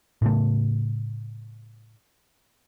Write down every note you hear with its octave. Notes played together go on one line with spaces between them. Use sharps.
A2 C#3 A3